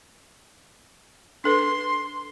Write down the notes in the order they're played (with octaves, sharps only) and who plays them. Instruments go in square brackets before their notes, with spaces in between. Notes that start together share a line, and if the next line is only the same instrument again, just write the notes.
[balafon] D4 A4 B4 [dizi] C6